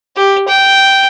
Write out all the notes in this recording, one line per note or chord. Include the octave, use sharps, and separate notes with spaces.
G4
G5